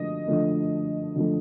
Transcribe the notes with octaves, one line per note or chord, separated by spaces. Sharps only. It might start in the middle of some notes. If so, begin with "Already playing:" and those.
Already playing: D3 F3 A3 D#5
D3 F3 A3
D3 F3 A3